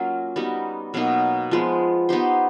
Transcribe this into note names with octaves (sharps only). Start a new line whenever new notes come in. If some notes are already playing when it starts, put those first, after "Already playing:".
Already playing: F#3 A#3 C#4 F4
G3 B3 D#4 F#4
B2 F#3 A#3 D#4
F3 G#3 B3
B3 D#4 G4 C5